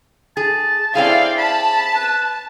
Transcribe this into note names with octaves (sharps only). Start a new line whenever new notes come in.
G#4 A5
C4 E4 G#4 D5 F5 G5
A5 B5
B4